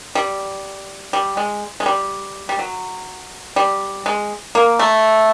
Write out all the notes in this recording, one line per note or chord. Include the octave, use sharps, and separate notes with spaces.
G3
G3
G#3
G#3
G3
G3
F#3
G3
G#3
A#3
A3